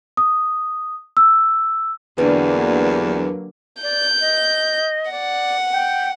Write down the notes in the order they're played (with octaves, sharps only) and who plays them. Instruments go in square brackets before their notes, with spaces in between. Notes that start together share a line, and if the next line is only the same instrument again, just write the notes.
[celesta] D#6
E6
[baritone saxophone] E2 [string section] D3 F#3 A#3 [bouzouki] G3 [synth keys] D4 B4
[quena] D5 [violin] G6
[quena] D#5
[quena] D5 [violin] F#5
[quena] G5